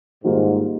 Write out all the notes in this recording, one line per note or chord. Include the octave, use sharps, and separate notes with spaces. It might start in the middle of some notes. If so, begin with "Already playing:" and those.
G#2 D#3 G3 A#3 F4